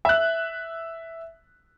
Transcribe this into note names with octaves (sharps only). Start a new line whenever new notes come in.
E5 F#6